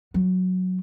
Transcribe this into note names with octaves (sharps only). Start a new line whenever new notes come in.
F#3